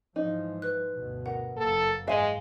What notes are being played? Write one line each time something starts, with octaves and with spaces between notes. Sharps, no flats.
G#2 E3 F3 D#4
B4 F#6
D2 G2 B2
A#4 F#5
F#1 A#3 A4
G#2 E3 G#3 E5 F5 G#5